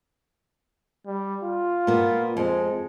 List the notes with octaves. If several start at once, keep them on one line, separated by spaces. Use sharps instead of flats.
G3
F4
A#2 B3
F2 G#3